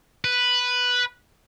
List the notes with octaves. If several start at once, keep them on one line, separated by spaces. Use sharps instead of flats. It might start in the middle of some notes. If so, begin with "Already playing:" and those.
B4